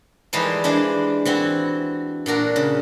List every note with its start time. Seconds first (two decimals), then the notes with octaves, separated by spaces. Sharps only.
0.33 E3 F3 G3 G#3 D#4 C5
0.64 E3 G#3 D4 C5
1.25 E3 C4 F#4
2.26 A#2 D4 F#4 A#4
2.56 C#3